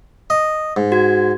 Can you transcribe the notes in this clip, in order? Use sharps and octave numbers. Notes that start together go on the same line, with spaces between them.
D#5
G#2
F#4 G#6